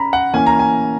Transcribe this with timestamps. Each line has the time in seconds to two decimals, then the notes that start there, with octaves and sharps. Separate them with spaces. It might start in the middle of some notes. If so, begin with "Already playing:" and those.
Already playing: C#4 A#5 B5
0.13 F#5
0.34 E3 A#3 C#4 G#5
0.47 A#5
0.59 G#5